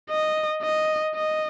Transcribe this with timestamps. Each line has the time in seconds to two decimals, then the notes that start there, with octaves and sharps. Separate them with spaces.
0.10 D#5
0.63 D#5
1.16 D#5